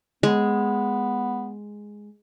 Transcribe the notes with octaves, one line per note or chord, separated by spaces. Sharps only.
G#3 B3